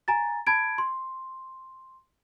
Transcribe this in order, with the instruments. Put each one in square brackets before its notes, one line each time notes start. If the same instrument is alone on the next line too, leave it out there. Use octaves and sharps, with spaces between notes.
[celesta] G#5 A#5 A6
A5 B5 G#6 D7
C6